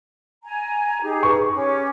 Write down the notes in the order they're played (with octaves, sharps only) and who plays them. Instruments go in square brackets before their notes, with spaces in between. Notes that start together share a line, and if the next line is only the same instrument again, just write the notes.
[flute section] G#5 A#5
D#4 G4 G#4
[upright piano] B4 C#6
[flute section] C#4 G4 D6